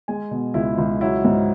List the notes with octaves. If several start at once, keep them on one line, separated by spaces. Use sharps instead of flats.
G#3 G#5
B2
C#2 E4
C#2
F#3 E4
G#2